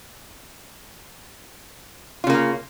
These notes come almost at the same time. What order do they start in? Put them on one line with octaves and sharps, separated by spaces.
F4 C#3 A#3